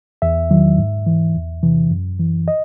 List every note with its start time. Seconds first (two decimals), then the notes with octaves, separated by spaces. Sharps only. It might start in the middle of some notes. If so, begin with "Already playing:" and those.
0.22 E2 E5
0.51 D#3 F#3
0.78 G#2
1.06 E3
1.35 E2
1.63 C3 E3
1.91 F#2
2.19 E3
2.48 D#5